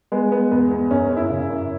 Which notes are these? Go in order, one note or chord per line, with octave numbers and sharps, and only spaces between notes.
G#3 B3
G#3 B3
E2 B3
E2
F#2 C#4
C#4
F#2
E4
C#3
F#2